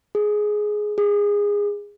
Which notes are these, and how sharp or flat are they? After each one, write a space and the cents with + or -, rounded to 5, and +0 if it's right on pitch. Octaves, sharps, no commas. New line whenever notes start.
G#4 +10
G#4 -20